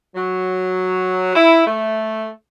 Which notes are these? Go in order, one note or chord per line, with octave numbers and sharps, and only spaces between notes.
F#3
E4
A3